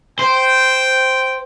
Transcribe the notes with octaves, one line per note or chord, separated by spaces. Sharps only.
C5 G5